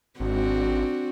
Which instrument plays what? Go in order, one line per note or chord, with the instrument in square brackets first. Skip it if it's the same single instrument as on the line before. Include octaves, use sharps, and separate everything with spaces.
[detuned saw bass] G#1 [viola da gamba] C4 D4 F#4